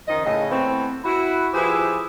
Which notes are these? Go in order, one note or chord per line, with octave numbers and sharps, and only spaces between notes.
F#2 D#3 F3 D#4 D#5
A2 C#3 D#5
E3 A3 B3 C4
E4 F#4
F3 E4 G4 G#4 B4 C5